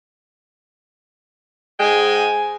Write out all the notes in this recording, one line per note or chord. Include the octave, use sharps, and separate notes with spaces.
G#2 G#3 G5 G#5